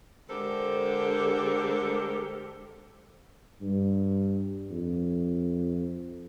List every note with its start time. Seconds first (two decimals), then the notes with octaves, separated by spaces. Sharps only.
0.30 D3 G#3 G4 A4 A#4 C5
3.62 G2
4.70 F2